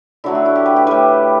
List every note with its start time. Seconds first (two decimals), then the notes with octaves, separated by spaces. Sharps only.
0.24 D3 F#3 A3 E4
0.35 F#4
0.45 E4
0.56 G4
0.66 B4
0.76 G4
0.87 A2 G3 B4